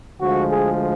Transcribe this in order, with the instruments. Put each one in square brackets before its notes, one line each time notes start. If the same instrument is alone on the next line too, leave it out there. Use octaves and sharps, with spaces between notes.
[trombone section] D2 D3 F3 G#3 F#4
G#4